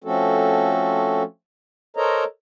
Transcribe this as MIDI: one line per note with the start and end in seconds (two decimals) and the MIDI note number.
0.04 1.23 53
0.04 1.23 57
0.04 1.23 60
0.04 1.23 61
0.04 1.23 66
0.04 1.23 69
1.97 2.24 69
1.97 2.24 70
1.97 2.24 72
1.97 2.24 73
1.97 2.24 75
1.97 2.24 82